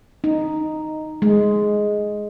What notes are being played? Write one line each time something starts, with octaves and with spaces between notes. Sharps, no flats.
D#4
G#3